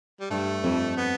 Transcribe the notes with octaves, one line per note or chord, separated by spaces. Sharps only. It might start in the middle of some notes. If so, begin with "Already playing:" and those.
G3
G2 A3
F2
B3